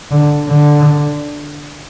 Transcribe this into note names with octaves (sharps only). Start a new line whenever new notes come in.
D3
D3